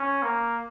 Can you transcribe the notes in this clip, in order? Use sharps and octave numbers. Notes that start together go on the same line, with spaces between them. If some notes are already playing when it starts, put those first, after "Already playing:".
Already playing: C#4
A#3